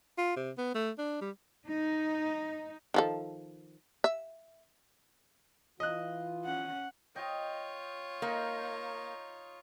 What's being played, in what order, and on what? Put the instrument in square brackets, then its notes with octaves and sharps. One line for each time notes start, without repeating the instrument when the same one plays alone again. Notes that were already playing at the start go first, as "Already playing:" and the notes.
[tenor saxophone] F4
C3
B3
A3
D4
G3
[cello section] D#4
[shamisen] D#3 F3 A4
E5
[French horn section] E3 F4 [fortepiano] D#5 F#6
[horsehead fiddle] C#4 F#5
[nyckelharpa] F4 C#5 [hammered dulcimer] D#5 G5
[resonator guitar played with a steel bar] A#3 [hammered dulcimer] D#4